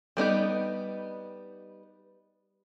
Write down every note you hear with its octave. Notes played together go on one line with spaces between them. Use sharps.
G3 B3 D#4 G4